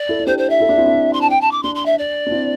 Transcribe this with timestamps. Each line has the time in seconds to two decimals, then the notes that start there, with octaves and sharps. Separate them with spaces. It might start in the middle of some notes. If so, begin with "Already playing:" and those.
Already playing: D5
0.09 E4 A4
0.20 E4
0.26 D4 G4 C5
0.38 C5
0.50 E5
0.60 E4 A4
0.69 D4 G4
0.78 C4 E4
0.86 D4
0.95 C4
1.13 C6
1.21 A5
1.30 G5
1.41 A5
1.51 D6
1.63 D4 C6
1.75 C6
1.86 E5
1.98 D5
2.27 D4
2.31 C4 E4